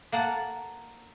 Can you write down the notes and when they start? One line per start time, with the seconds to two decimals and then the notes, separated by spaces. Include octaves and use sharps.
0.12 A#3 F#5 A5